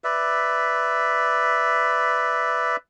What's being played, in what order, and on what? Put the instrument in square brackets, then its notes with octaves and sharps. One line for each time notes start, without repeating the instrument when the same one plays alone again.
[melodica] B4 D5 E5